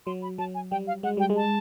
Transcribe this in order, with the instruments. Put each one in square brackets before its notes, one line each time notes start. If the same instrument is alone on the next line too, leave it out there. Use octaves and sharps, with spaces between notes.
[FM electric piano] F#3 [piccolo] C6
[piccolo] B5
[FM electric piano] F#3 [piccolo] A5
[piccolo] G#5
[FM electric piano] G3 [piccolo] G5
[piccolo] F5
[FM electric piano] G#3 [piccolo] F#5
[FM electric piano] G3 [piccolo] G5
[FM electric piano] G#3
[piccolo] A5